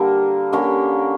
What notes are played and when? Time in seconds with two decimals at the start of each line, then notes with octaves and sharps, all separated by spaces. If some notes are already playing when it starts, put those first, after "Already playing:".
Already playing: D3 G3 A#3
0.53 D3 A#3 C#4 G4